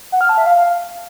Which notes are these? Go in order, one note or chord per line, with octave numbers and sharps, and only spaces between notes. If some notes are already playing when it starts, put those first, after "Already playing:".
F#5
F6
A5
E5
F5